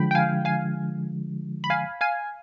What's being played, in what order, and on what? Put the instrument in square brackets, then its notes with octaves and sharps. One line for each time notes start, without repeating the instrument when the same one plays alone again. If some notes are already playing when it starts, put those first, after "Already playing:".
Already playing: [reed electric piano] D3 F3 G#3 [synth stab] G5 B5
[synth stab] G5
F5 G#5
F5 G#5
B5
F5 G#5
F5 G#5